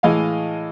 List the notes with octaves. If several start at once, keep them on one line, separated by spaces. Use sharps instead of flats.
A2 E3 G#3 D#5 F5